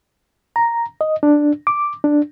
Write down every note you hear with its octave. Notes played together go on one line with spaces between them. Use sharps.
A#5
D#5
D4
D6
D4